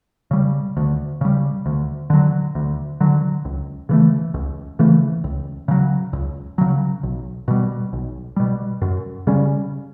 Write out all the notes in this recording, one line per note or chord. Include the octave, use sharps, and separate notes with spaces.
C#3 G3
D2
C#3 G3
D2
D3 F#3
D2
D3 F#3
C#2
C#3 E3 A3
C#2
C#3 E3 A3
C#2
C#3 F#3
C#2
C#3 F#3
B1
B2 G3
B1
B2 G3
F#2
C#3 G3 C#4